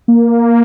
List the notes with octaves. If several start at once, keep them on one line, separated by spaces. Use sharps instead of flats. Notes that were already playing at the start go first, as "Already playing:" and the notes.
A#3